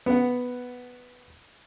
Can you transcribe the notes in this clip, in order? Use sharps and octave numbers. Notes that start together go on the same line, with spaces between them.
B3 F#5